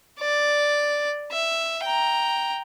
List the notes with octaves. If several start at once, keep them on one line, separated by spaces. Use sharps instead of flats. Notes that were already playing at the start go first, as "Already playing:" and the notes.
D5
E5
G5 A#5